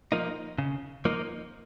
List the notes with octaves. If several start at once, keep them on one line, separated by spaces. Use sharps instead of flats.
F3 A#3 D#4
C#3
F3 A#3 D#4